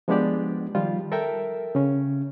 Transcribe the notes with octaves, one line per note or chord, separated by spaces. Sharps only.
F3 G#3 B3 D4 G4 D5
D#3 F3 G3 F4
A4 A#4 E5 G5
C#3 C#4